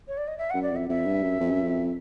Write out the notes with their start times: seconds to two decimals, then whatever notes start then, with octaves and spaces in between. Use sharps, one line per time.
0.08 C#5
0.17 D5
0.28 D#5
0.38 E5
0.50 F#2 F#5
0.62 D5
0.71 F2 E5
0.89 F2 E5
1.06 G2
1.23 F#2
1.40 F2
1.51 F#2
1.63 F2